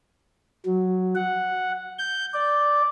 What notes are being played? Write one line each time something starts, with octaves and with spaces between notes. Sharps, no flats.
F#3
F#5
G6
D5